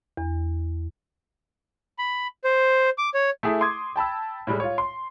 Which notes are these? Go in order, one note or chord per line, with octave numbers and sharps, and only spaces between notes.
E2
B5
C5
D6
C#5
A3 E4 G#4
C6 D6 D#6 G#6
G5 A5 B5 E6
A2 G3 G#3
F4 C#5
C6